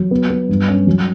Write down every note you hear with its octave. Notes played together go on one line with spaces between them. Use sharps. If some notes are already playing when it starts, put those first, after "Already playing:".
Already playing: F#3
B3
B3
G2
C#4
F#3